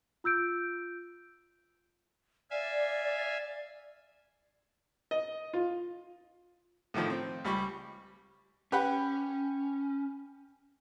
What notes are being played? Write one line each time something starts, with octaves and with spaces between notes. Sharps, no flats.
F4 E6 G6 D7
D5 E5 F5 G#5
D#5
F4
A2 D3 D#3 F3
C4
C#2 G3 B5 C#6
C#4 G4 B4 F#5